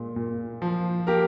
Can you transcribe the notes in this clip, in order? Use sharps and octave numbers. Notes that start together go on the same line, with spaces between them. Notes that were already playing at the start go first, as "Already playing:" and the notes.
Already playing: A#2 G#3
A#2
F3
A#3 G4 A#4